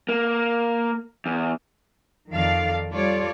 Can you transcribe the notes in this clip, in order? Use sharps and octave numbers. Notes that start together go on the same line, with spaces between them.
A#3
E2
F2 D#3 F3 A4 D5 F5
G3 F4 A4 C#5 D5